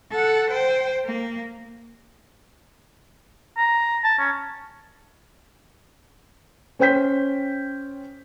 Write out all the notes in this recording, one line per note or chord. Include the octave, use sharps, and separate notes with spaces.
A4 F#5
C5 G5
A#3
A#5
A5
C#4
C#4 C5 G5 G6 B6